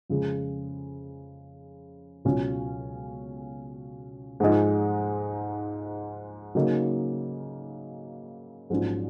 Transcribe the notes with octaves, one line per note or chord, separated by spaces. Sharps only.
F2 C#3 G#3
C#2 B2 F#3 C#4
G#2 F3 G#3 D#4
C#3 F#3 A#3 D#4
A#1 G#2 F#3 C#4 F4